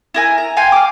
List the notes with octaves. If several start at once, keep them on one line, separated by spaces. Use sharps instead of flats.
E4 A#4 G#5
A#5
F5 G5 G#5 C6
D6 F6